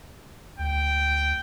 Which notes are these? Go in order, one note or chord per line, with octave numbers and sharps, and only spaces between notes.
D2 G5